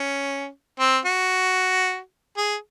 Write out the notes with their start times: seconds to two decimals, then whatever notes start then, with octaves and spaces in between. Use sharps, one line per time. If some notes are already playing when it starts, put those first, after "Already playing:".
Already playing: C#4
0.79 C4
1.05 F#4
2.37 G#4